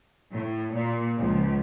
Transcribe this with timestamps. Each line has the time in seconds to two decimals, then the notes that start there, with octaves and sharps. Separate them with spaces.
0.32 A2
0.74 A#2
1.18 C#2 F3